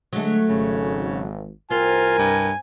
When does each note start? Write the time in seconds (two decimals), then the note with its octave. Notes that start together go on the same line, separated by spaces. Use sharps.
0.13 D3 F#3 G#3 A3
0.49 G#1 C#3
1.71 C2 C4 F4 A#4 G#5
2.18 G2